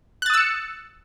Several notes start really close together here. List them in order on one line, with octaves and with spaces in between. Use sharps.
F#6 A6 D#6 E6 C#7